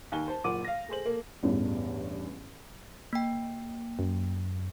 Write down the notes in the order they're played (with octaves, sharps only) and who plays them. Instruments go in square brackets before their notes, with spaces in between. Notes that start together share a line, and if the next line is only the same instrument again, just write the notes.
[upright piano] D#2 G#5 G7
C5 A5
F#1 A#2 F#5 D6 D#7
F5 A#6
A3 G#4 C5 F#7
A#3 A4
[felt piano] A1 E2 G2
[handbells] A#3 G5
[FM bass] F#2